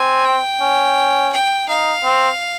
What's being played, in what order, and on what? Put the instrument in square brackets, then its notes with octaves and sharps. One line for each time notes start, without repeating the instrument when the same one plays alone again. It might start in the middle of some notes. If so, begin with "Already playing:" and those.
Already playing: [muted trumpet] C4 [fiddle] G#5
[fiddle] G5
[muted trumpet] C#4
[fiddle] G5
[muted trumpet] D#4 [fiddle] F5
[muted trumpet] C4